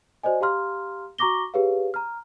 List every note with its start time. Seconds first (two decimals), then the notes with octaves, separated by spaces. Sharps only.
0.23 F#4 C5 D5 D#5 G#5
0.41 G4 F5 A#5 C6 F6
1.18 F#4 A#5 C#6 D6 A#6 G7
1.54 G4 G#4 B4 C#5 F5
1.94 A#5 F6